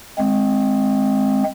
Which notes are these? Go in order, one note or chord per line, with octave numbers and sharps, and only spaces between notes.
G#3 C4